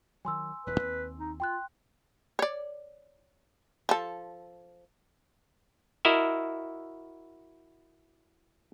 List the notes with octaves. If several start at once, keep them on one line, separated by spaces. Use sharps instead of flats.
D#3 F#3 G#5 C6 E6
E1 E2 B4
D#2 C4
D#4
F4 G5 C6 F#6
C#5 D5
F3 A4
E4 F#4 A#4 D#5 E5